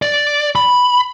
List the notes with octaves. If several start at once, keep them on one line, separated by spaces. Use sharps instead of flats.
D5
B5